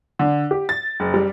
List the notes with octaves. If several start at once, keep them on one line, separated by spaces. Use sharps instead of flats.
D3
G4
A6
F#1
G3